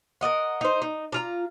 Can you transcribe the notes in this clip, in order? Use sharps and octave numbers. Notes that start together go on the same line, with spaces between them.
A#4 D5 D#5 F#5
D#4 C5
D#4
D4 F4 A#5